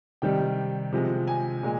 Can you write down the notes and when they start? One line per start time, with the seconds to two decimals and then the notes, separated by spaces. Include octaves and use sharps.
0.22 C3 D#3 G3 G5
0.92 C3 F3 G#3
1.27 G#5
1.63 A#2 G#3